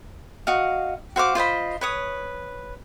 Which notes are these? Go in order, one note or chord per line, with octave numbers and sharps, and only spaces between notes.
F#4 D#5 F5
F#4 C5 F5 D6
F4 C5 D#5 B5
B4 C#5 D#6